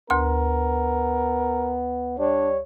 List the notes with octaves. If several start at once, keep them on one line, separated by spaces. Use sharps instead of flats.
D2 B3 A#4 C6
G3 D4 C#5